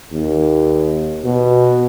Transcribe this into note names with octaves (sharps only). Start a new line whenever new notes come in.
D#2
B2